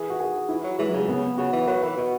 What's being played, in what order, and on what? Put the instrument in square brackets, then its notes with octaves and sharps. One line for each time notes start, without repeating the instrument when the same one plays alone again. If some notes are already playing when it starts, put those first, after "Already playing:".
Already playing: [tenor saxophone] E3 [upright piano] G#4
[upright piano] F#4
G#4
[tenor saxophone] E3 [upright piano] E4
[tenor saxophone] F#3
[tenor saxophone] E3 [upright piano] G#3
[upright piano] F#3
[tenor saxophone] C#3
[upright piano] G#3
B3
[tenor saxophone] C#3 [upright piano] F#4
[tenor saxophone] E3
[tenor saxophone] F#3 [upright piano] B4
[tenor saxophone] E3 [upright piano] B4
[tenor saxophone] B2 [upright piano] F#4